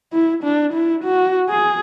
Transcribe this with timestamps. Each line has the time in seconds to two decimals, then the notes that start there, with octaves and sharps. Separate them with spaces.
0.12 E4
0.44 D4
0.74 E4
1.04 F#4
1.50 G#4